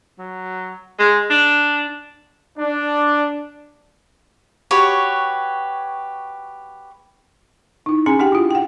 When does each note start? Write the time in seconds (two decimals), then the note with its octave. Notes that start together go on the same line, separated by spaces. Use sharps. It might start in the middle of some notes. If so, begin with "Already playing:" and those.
0.19 F#3
0.99 G#3
1.30 D4
2.58 D4
4.71 F#4 G4 B4 C#5
7.86 D#4 E4
8.06 C#4 G#4 G#5 A#5
8.19 C#4 D4 G4 F#5 G5
8.32 E4 F4
8.50 F#5 G5